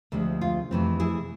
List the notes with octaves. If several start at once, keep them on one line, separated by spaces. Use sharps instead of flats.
D2 C3 F3 G#3
F4
F2 C3 E3 A3 C4
E4 G#4